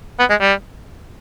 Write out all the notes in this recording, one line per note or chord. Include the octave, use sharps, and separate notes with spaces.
B3
G#3
G3